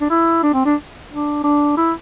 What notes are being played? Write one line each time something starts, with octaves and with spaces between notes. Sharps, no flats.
D4
E4
D4
C4
D4
D4
D4
E4